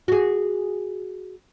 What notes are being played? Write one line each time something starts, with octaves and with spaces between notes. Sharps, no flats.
F#4 G#4